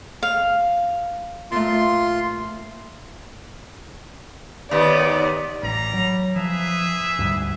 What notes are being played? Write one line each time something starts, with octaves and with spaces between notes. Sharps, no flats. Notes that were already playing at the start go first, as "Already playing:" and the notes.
F5
A#2 A3 F4 C6
D#2 B3 D5
A1 G3 A#5
F#3
F3 G#4 B4 E5
D2 G#2 G3